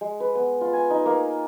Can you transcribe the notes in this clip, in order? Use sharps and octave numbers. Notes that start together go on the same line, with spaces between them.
G#3
B4
B3
F4
G#5
D#4
A#3